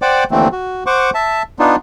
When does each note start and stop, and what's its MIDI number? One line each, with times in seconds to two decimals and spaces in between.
0.02 0.24 72
0.02 0.24 74
0.02 0.24 78
0.02 0.24 79
0.02 0.24 86
0.31 0.48 39
0.31 0.48 50
0.31 0.48 52
0.31 0.48 57
0.31 0.48 60
0.52 0.84 66
0.86 1.10 72
0.86 1.10 78
0.86 1.10 85
0.86 1.10 86
1.14 1.43 76
1.14 1.43 81
1.59 1.76 59
1.59 1.76 62
1.59 1.76 63
1.59 1.76 65